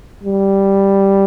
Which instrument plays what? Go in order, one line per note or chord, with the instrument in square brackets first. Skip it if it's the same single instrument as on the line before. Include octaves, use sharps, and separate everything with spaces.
[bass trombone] G3